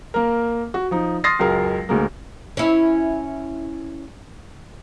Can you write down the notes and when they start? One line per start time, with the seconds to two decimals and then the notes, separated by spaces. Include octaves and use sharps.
0.14 A#3 A#4
0.74 F#4
0.91 F3 D#4
1.24 C6 D#6 F6 A6 A#6 C7
1.39 C#2 F#2 G#3 A#4
1.89 D2 G#3 A#3
2.57 C#4 E4